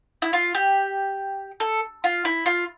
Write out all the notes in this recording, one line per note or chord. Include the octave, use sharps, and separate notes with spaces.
E4
F4
G4
A4
F4
E4
F4